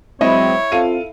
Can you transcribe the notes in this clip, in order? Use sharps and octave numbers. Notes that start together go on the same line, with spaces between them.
F#3 G#3 C4 E4 C#5 D#5
C4 F4 A4 F5 D#7